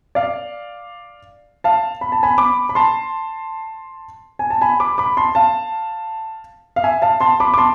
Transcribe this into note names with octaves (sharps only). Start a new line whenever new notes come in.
D5 F5
F5 A5
B5
A5
G#5 B5
B5 D6
B5
A5 C6
G#5
A5
G#5 B5
B5 D6
B5 D6
A5 C6
F5 A5
F5
E5 G#5
F5 A5
A5 C6
B5 D6
D6
A5 C6